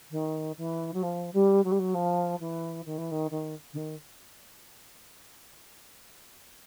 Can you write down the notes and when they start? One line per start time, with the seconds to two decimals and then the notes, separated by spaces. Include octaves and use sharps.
0.11 D#3
0.58 E3
0.94 F#3
1.03 F3
1.34 G3
1.64 F#3
1.72 G3
1.79 F#3
1.94 F3
2.40 E3
2.86 D#3
2.98 E3
3.12 D#3
3.31 D#3
3.73 D3
3.77 D#3